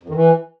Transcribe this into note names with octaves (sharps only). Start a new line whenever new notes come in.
F2
D#3
E3